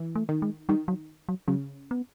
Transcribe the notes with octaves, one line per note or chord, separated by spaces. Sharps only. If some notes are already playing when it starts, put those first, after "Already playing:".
Already playing: E3
A3
D#3
G#3
D#3 G3
F#3
F#3
C#3 F#3
B3